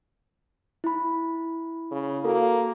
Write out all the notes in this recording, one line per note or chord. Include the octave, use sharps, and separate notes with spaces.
E4 B5
C#3
A#3 F#4 A4